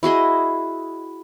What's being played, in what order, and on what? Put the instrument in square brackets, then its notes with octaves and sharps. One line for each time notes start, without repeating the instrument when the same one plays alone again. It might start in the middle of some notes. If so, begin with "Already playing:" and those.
[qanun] E4 F#4 G#4 D#5